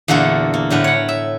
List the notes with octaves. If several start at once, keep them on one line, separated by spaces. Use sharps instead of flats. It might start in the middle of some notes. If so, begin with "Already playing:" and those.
E2 A#2 D3 A#3 F#4 A4
A#3
A2 D3 G3 A#4 B4
C#5 F#5
E5